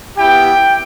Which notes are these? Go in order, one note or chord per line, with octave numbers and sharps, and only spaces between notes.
B3 E4 G4 G5